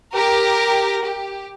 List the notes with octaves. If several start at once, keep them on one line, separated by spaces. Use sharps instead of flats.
G4 A#4
G4